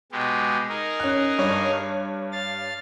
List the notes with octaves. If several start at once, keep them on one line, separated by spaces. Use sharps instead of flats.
B2 G#3 G4
D#4 G#4 A#4
C#4 F#6
G2 C#5
F5 A6